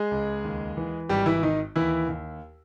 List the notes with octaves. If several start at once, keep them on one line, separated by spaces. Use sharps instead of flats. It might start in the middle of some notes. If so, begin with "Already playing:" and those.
Already playing: G#3 G#4
C#2
D#2
E3
G#1 G3 G4
E3 E4
D#3 D#4
D#2 E3 E4
D#2